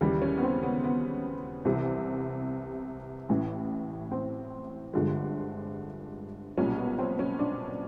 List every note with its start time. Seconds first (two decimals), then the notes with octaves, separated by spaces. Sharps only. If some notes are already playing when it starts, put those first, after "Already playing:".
0.01 D#2 C#3 E3 G3
0.22 C#4
0.37 B3
0.43 C4
0.63 B3
0.84 B3
1.65 C2 C3 E3
3.29 A1 A2 E3
4.12 C4
4.93 G1 G2 D3 F3 G#3
6.58 B1 A#2 G3 C#4
6.78 B3
6.99 C4
7.19 C#4
7.39 D4